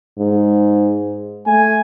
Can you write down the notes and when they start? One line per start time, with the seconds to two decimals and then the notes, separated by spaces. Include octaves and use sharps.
0.19 G#2
1.47 A3 G#5